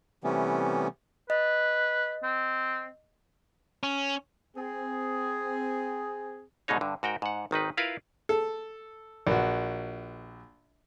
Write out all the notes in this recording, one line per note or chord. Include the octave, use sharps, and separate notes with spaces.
C3 E3 G3 A3 B3 C#4
B4 D#5
C4
C#4
C4 G#4
C2 G#2 B2 G#3 D#4 C#5
G2 D3
G#2 F#4 A#4 G5
G#2 F#5
G#1 D#3 D#4 B4
E4 F4 A#4 B4 F5
A4
A#1 F#4